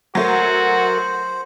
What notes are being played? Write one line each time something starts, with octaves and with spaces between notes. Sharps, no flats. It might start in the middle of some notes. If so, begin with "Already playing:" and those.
F#3 A3 F#4 A#4 C5 F#5